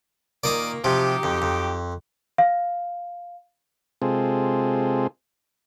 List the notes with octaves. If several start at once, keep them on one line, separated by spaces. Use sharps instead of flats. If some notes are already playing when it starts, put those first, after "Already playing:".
A#2 D#3 A#3 D5 D#5 D6
C3 F3 F#3 D#4 G4
F2
F2
F5
C3 G#3 C4 F4 G#4 A4